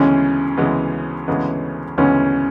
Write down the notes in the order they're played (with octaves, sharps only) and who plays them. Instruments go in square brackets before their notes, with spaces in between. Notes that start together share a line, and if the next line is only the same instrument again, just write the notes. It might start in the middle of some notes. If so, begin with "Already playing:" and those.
Already playing: [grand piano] D2 C#3 E3 G#3 B3 [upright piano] C#4
[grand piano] D2 C#3 E3 G#3 B3
D2 C#3 E3 G#3 B3
[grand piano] D2 C#3 E3 G#3 B3 [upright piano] C#4